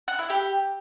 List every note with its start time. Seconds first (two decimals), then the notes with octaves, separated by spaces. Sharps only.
0.08 F#5
0.19 E4
0.30 G4